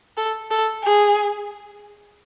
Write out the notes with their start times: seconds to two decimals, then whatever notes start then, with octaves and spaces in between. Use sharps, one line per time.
0.17 A4
0.51 A4
0.84 G#4